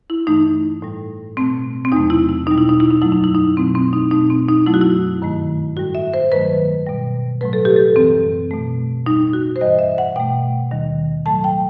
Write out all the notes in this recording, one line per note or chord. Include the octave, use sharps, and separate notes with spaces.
E4
G2 E3 A3 D#4
A2 G3
B2 A3 C4
C4
E2 C3 F#3 A3 D#4
E4
E4
B2 G3 D#4
E4
D#4
E4
D#4
F#2 F#3 A3 E4
D#4
E4
D#4
B2 F#3 A3 C4
C4
D#4
B2 A3 D#4
C4
D#4
F#2 F#3 A3 E4
F#4
E4
G2 D#3 A3
A2 G3 F#4
E5
C5
G2 D#3 F#3 A3 B4
B2 G3
A2 F#3 A3 B4
A4
G4
A4
F#2 E3 G3 C4
B2 A3
A2 G3 D#4
F#4
C5
G2 E3 G3 D#5
E5
F#5
B2 A3 G5
D#2 D#3 G3
A2 F#3 A3 A5
G5